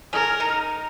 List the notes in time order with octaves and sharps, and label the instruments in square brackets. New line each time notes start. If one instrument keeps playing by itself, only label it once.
[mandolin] C#4 [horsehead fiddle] A#4
[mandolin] D#4